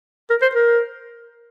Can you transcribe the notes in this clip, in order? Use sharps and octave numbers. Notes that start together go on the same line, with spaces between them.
A#4
C5
A#4